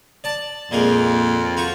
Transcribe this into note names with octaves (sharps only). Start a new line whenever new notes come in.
D5 A5
F2 A#2 G#3 A#4
F4 F#4 C#6